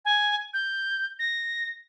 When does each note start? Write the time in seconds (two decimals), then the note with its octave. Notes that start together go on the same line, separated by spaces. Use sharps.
0.05 G#5
0.54 G6
1.19 A#6